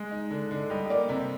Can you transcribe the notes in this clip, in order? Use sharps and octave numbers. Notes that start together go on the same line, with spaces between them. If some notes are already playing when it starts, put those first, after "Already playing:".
Already playing: G#3
D#4
D3
D3
G3 D#5
D#5
A#3 D5
C3